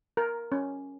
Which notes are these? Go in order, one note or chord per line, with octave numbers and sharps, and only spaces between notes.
A#4
C#4